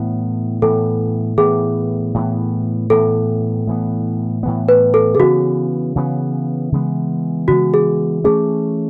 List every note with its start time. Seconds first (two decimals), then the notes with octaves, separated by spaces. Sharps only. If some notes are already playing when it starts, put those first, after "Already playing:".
Already playing: A2 E3 B3
0.62 A2 E3 B3 A4
1.38 A2 E3 B3 G#4
2.14 A2 E3 B3
2.90 A2 E3 B3 A4
3.67 A2 E3 B3
4.43 A2 E3 B3
4.69 B4
4.94 A4
5.15 G#4
5.19 C#3 E3 G#3 B3 F#4
5.96 C#3 E3 G#3 B3
6.72 C#3 E3 G#3 B3
7.48 C#3 E3 G#3 B3 F#4
7.74 G#4
8.24 E3 A3 C#4 G#4